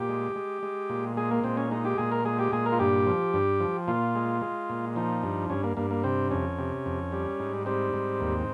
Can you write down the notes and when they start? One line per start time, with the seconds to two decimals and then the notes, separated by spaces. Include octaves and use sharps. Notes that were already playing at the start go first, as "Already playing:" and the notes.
Already playing: A#2 G4
0.09 G#3
0.36 G#3
0.63 G#3
0.90 A#2
1.17 G#3 G#4
1.31 A#3
1.44 A#2 C4
1.57 C#4
1.71 G#3 D#4
1.85 G4
1.98 A#2 G#4
2.12 A#4
2.25 G#3 G#4
2.39 G4
2.52 A#2 G#4
2.66 A#4
2.72 F4
2.79 G2 G4
3.06 F3
3.33 G2
3.60 F3
3.88 A#2 F4
4.15 G#3
4.42 G#3
4.70 A#2
4.96 F3 D#4
5.23 G2
5.50 G2 C#4
5.64 A#3
5.77 G2 A#3
5.91 A#3
6.04 C3 C4
6.31 F2 C#4
6.59 C3
6.86 F2
7.12 G3
7.39 G#2
7.66 G3 C4
7.93 G#2
8.21 D#2